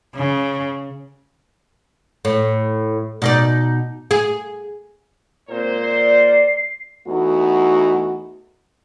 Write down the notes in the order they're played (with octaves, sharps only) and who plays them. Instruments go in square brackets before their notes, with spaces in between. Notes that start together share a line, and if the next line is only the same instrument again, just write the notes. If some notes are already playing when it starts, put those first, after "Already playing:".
[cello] C#3
[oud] A2
B2 D#4 D5
G#4
[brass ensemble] A#2 A#4 C5 [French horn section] G#3 C4
[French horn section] D5 [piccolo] C7
[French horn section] E2 A3 D#4 F#4